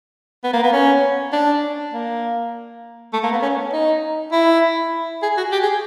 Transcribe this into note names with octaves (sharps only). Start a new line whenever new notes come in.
B3
A#3
B3
C#4
D4
A#3
A3
A#3
B3
C#4
D#4
E4
G#4
F#4
G4
G#4